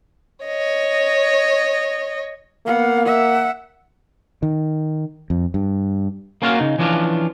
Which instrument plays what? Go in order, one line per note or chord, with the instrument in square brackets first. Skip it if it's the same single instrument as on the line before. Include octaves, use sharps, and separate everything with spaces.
[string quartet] C#5 D#5
[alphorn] A#3 [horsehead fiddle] B3 F#5 [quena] F5
[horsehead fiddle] E5 [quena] F#5
[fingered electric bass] D#3
F2
G2
[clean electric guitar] A#3 C#4 F4 F#4 A#4 F5
C#3 D#4
E3 F3 C#4 D4 F4